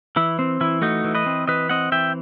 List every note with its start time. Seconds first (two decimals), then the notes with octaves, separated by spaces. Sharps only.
0.16 E3 E4
0.39 C4
0.61 E3 E4
0.82 A3 D#4 F#4
1.04 E3
1.15 B4 D#5
1.26 C4
1.47 E3 B4 D#5
1.69 C4 D#5 F#5
1.92 E3 E5 G5